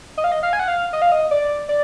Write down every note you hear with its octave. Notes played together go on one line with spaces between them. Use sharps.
D#5
F5
D#5
F5
G#5
F#5
F5
D#5
F5
D#5
D5
D5